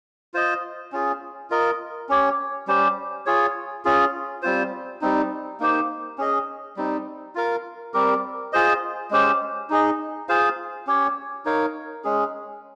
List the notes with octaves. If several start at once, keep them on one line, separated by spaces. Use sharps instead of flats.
F4 C5 D#5
C#4 F4 G#4
F4 A#4 D#5
C#4 G4 C#5
G3 C#4 G4 C5
F4 G#4 C#5
C#4 F4 G#4
G3 C4 F4 C5
G3 C4 D#4
A#3 D#4 G4 C5
C#4 G#4 D#5
G3 C4 D#4
F4 A#4 F5
G3 C4 G4 A#4
F4 G#4 C5 D#5
G#3 C#4 G4 C5
D#4 G#4 D#5
F4 G#4 C5 F5
C#4 G4 C#5
D#4 A#4 C#5 F5
G#3 C#4 G#4